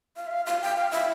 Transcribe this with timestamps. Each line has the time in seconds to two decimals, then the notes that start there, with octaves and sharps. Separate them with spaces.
0.16 F5
0.27 E5
0.31 F5
0.46 F5
0.62 G5
0.76 F5
0.91 E5